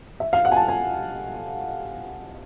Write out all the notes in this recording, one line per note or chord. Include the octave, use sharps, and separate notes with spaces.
E5
F5
F#5
G#5
A5
G#5